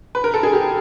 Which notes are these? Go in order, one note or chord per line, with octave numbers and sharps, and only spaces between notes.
B4
A#4
A4
G#4
G4